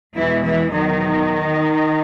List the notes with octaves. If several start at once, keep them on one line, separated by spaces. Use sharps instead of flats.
E2 B2 E3 G#3 E4
E3 E4
E2 B2 D#3 F#3 D#4